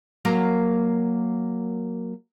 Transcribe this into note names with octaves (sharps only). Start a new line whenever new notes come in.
F#3 A#3 A#4